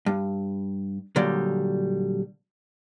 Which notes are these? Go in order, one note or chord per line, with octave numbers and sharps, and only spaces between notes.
G2
A#2 D3 F#3 G3